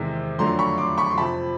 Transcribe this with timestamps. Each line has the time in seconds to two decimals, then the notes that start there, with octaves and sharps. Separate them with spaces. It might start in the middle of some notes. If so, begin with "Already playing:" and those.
Already playing: E2 C3 D#3 G#3
0.39 F2 D3 F#3 A3 A#5 C6
0.59 B5 C#6
0.78 C6 D6
0.98 B5 C#6
1.11 C6
1.17 F2 C3 F3 A5 B5